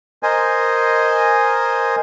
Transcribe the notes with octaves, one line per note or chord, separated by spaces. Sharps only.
A#4 C5 D#5 G#5